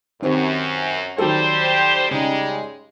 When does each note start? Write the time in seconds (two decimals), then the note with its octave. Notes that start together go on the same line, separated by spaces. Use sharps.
0.22 F#2 D#3 C4 G4
1.18 D#3 F#3 G3 G4 A4 C5
2.11 C#3 G3 G#3 D#4